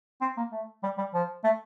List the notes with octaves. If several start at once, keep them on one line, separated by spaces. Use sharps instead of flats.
C4
A#3
A3
G3
G3
F3
A3